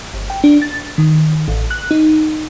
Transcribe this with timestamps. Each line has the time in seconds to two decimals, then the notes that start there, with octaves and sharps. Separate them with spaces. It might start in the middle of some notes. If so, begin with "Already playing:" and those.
0.14 G1
0.30 G5
0.44 D4
0.62 A6
0.98 D#3
1.48 A1
1.71 F#6
1.91 D#4